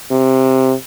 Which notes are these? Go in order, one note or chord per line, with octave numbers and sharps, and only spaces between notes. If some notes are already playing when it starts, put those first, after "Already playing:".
C3